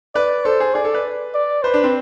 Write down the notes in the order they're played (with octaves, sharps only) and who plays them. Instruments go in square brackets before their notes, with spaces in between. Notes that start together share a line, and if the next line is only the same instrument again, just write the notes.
[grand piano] B4 [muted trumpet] D5
[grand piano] A4 [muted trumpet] C5
[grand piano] G#4
[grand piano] G#4 [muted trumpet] D5
[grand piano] A4
B4
[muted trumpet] D5
[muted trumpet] B4 [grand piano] C5
[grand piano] D4
C4